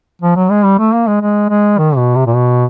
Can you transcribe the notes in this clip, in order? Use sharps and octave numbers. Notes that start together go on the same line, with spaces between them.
F3
F#3
G#3
G3
A3
A#3
G#3
G#3
G#3
D#3
B2
C3
A#2
B2